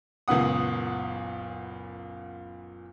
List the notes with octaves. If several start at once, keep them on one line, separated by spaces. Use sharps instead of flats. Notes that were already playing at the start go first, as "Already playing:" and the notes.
F#1 C#2 A#2 B3 F#5 D#6